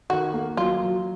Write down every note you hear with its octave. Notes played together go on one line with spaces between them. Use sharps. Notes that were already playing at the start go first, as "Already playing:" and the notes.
D#3 F#4
A#3
F#3 F4
F#3